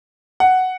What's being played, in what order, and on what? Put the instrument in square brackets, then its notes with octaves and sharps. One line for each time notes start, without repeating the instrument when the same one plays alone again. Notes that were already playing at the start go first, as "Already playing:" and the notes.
[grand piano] F#5